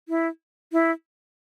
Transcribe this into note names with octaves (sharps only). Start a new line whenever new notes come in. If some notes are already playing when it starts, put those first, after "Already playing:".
E4
E4